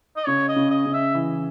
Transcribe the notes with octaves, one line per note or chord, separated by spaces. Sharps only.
D#5
C#3 C#5
D#5
C#3
D#5
C#3
E5
E3